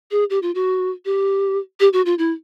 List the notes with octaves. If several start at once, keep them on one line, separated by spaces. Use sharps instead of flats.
G#4
G4
F4
F#4
G4
G4
F#4
F4
E4